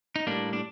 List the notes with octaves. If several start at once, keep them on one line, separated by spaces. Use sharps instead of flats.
D#4
A2 G3 A#3 D4
D4